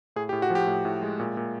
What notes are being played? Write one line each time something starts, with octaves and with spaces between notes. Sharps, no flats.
A2 G#4
G4
A2
F#4
F3
G4
A2
A2
G#3
A#2
A#2